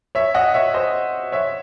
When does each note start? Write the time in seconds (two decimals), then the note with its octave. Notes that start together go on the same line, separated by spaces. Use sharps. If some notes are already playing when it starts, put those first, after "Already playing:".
0.15 C#5 E5
0.34 D#5 F#5
0.54 C#5 E5
0.74 C5 D#5
1.32 C#5 E5